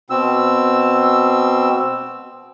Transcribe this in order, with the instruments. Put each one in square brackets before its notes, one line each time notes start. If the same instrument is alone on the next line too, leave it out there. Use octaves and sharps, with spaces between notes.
[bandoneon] B2 C4 E6